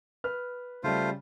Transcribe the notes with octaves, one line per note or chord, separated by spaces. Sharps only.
B4 F6
C#3 G3 A3 F4 C5